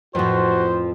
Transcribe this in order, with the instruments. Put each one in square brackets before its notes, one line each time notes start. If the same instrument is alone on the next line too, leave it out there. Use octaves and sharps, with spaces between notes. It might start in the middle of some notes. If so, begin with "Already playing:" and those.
[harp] F2 A2 [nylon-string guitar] F3 B4 [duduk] F#4 [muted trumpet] C5